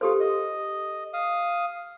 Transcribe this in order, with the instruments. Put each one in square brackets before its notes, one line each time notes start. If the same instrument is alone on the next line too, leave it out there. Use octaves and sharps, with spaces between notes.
[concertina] F4 [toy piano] G4 A4 C5
[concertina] D#5
F5 D#6